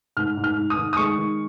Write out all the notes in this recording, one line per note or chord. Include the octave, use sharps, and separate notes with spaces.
G#2 F6
G#2
F6
G#2
D#6
D#3
D#6
G#3 C#6
D#3